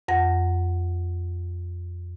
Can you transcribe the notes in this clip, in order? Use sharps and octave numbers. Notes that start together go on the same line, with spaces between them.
F2 F#5 A#6